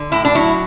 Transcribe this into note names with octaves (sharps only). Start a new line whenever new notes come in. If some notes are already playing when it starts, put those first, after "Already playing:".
Already playing: D3
A2 E4
D4
F#3 E4